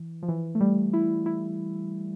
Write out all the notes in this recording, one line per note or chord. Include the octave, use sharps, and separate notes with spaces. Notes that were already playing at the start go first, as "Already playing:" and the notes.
Already playing: E3
F3
E3
A3
G3
E4
E4